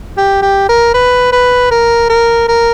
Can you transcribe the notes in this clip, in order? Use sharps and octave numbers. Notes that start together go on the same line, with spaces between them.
G4
G4
A#4
B4
B4
A#4
A#4
A#4